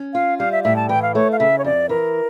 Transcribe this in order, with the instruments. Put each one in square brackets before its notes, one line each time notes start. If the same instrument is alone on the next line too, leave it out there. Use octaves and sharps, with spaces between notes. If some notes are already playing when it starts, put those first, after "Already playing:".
Already playing: [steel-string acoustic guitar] C#4
[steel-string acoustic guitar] F4 [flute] F5
[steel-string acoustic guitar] G3 [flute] F5
[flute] E5
[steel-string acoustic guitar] A2 [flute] E5
[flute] A5
[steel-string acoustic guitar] E3 [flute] G5
[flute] F5
[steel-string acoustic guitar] A3 [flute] C#5
[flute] F5
[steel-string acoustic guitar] C#3 [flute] E5
[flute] C#5
[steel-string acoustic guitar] F2 [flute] D5
[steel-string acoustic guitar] E3 [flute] A#4